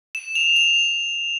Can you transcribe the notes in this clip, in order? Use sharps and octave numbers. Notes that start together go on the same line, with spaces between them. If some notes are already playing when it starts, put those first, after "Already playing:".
E7
F7
F7